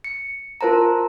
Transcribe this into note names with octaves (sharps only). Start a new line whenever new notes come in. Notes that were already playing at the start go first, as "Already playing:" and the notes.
C#7
F4 A#4 C5 A5 A#5